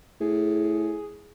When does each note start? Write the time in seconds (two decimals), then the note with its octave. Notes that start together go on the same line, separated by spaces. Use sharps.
0.21 A2 G#4